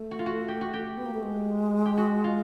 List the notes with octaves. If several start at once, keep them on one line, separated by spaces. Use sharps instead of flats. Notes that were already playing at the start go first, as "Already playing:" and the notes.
Already playing: A3
F#4
F4
F#4
G4
F#4
G4
B3
A#3
A3
G#3
G4
F#4
F4